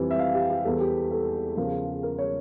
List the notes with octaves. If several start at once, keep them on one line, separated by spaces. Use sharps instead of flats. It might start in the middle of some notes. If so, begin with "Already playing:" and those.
Already playing: F2 E3 G3
E5
F5
G4
G4
E2 E3 G3 A4
G4
A4
E2 C#3 F3 A#4
A#4
C#5